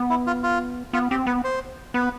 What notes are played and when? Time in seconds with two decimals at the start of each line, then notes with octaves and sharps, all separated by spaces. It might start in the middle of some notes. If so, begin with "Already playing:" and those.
Already playing: B3
0.10 E4
0.27 F4
0.43 F4
0.93 B3 F4
1.11 C4 G4
1.27 B3 B4
1.44 C5
1.94 B3 B4